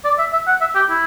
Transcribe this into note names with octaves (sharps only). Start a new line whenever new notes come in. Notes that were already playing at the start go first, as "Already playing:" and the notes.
D5
E5
E5
F#5
E5
G4
E4